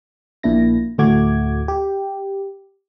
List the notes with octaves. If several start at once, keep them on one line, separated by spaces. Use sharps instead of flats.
A#1 A#2 A#3 D4 E4 A#6
D2 A2 A3 F#4 D6 G#6
G4